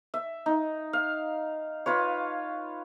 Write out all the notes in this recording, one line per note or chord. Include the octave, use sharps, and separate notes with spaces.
E5
D#4
F5
F4 B4 C#5